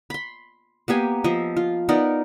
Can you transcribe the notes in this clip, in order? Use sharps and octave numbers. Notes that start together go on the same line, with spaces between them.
B5 C6
A#3 B3 G4 G#5
F3 D#5 E5
F4
B3 D#4 A#4 D5